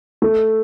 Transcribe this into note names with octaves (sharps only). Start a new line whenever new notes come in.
A3